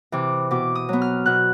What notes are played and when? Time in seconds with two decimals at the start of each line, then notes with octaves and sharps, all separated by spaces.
0.12 C3 E3 D6
0.51 B2 D6
0.75 D#6
0.89 F#3 B3
1.02 F6
1.26 B2 F#6